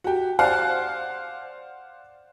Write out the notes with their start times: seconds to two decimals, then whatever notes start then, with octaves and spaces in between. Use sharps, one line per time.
0.04 F#4 G4
0.39 C5 D5 F5 F#5